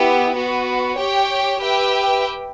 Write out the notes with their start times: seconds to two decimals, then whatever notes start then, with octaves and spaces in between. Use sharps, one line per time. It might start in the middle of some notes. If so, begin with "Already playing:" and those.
Already playing: B3 E4 G4
0.33 B3 F#4 B4
0.97 G4 C#5 G5
1.61 G4 B4 E5 G5